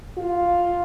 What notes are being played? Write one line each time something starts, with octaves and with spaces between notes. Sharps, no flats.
F4